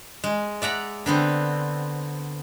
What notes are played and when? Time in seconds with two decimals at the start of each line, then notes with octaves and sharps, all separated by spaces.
0.24 G#3
0.62 D5 E5 F#5 A#5
1.06 D3 B3 C4